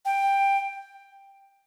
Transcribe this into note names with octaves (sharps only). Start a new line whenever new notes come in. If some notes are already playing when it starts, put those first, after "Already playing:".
G5